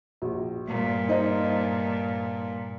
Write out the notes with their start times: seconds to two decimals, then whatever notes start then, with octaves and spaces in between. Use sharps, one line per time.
0.22 A#1 F#4
0.67 G2 A#2
1.09 D#4 C5 D#5